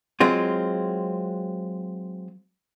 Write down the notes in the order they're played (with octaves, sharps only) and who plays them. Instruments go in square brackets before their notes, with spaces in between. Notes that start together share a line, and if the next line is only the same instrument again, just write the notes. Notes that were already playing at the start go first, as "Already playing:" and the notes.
[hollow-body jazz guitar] F#3 G#3 C4 F4